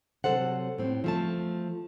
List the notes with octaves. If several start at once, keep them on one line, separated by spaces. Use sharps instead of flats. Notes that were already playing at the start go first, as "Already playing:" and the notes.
C3 F#3 A4 C5 F#5
A2 C4
F3 A3 A5